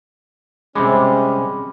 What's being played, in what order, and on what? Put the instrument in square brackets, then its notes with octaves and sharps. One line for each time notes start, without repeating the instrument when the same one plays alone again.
[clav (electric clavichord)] C3 G3 G#3 [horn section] C#4 [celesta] G#4 B5 D6